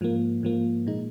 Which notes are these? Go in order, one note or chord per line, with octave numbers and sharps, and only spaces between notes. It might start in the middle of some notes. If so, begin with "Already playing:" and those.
G#2 F3 A#3
G#2 F3 A#3
A#2 G#3 D#4